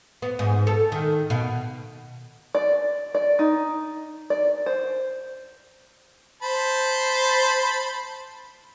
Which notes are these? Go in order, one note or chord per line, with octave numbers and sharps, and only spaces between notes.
B3
G#2
A4
D#3
B2
D5
D5
D#4
D5
C5
C5 A5 B5